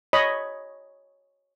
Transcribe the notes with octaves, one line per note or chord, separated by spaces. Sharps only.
C#5 D#5 B5